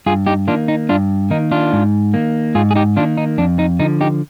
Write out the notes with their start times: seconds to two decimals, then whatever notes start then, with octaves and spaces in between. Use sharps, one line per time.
0.06 G2 F4 G#4
0.27 D#4 G4
0.48 D#3 A#3 D4 F4
0.68 D#4
0.89 G2 D4 F4
1.30 D#3 A#3 D#4
1.51 D4 F4
1.73 G#2
2.13 D#3 A#3
2.55 G#2 F4 G#4
2.71 G#4
2.76 D#4 G4
2.96 D#3 A#3 D4 F4
3.17 D#4
3.38 F2 D4
3.59 D#4
3.79 D3 F3 D#4
4.01 D#4 G4